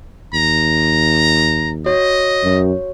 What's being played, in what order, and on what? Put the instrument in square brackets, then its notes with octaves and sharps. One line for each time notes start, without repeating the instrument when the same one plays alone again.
[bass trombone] D#2 [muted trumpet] A#5
[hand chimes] F#4 C#5 [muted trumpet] D#5
[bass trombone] F#2